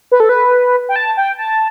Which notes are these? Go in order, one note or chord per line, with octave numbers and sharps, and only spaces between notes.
B4
A4
B4
G5
A5
G5
A5